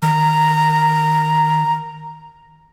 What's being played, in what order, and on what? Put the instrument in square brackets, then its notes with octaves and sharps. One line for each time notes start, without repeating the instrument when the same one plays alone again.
[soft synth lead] D#3 [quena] A#5